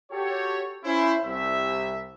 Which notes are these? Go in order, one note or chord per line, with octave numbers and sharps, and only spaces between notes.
F#4 G4 A4 C#5
C#4 E4 C5
C2 E5